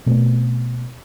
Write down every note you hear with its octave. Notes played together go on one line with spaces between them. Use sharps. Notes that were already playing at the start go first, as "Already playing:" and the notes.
B2 A3 C4